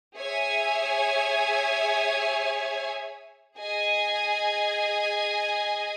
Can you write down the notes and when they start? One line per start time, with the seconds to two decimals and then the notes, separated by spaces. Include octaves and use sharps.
0.17 G#4 C#5 E5 G#5
3.57 G#4 D#5 G#5